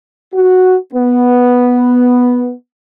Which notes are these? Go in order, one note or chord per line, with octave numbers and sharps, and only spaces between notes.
F#4
B3